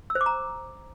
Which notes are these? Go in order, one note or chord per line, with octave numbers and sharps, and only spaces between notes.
E6
C5
D6
A#5